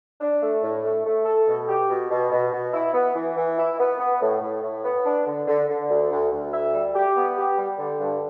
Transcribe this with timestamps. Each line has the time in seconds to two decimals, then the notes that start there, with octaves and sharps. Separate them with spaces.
0.20 D4
0.41 A3
0.62 A2
0.84 A3
1.04 A3
1.25 A4
1.46 B2
1.67 G4
1.89 B2
2.10 B2
2.31 B2
2.52 B2
2.73 E4
2.94 B3
3.15 E3
3.37 E3
3.57 E4
3.78 B3
3.99 B3
4.21 A2
4.41 A2
4.63 A2
4.84 B3
5.04 D4
5.26 D3
5.47 D3
5.68 D3
5.89 D2
6.11 D2
6.31 D2
6.52 E5
6.73 G3
6.94 G4
7.15 B3
7.37 G4
7.57 G3
7.79 D3
8.00 G2